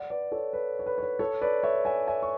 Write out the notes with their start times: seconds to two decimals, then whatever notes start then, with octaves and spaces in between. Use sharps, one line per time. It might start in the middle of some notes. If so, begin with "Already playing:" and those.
Already playing: D5 F#5
0.10 B4 D5
0.32 A4 C#5
0.53 B4
0.79 C#5
0.86 B4
0.98 C#5
1.03 B4
1.19 A4 C#5
1.41 B4 D5
1.63 C#5 E5
1.85 E5 G#5
2.07 E5 G#5
2.23 C#6